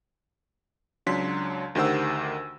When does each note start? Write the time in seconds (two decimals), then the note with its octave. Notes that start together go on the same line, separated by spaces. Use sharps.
1.06 C#2 F#3 D4 C6 B6
1.75 D2 D#3 G4 C5 F#5 E6